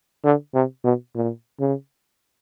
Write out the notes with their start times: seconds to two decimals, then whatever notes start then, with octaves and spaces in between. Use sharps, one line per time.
0.24 D3
0.54 C3
0.84 B2
1.15 A#2
1.60 C#3